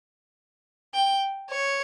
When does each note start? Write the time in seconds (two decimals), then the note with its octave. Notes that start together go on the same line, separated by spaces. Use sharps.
0.94 G5
1.50 C#5